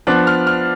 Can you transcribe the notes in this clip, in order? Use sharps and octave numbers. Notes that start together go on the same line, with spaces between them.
F3 B3 D4 F#6
F6
F6